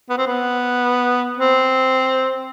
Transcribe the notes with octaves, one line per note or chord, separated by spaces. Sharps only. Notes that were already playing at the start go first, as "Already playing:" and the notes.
B3
C4
B3
C4